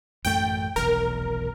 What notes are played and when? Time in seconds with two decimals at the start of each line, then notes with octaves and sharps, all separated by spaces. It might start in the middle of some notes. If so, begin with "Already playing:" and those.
0.25 A1 F#2 A3 G5
0.76 F1 B1 E2 A#4